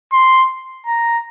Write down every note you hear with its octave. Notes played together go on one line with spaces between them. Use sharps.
C6
A#5